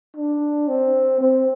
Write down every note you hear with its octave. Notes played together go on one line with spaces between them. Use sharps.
D4
C4
C4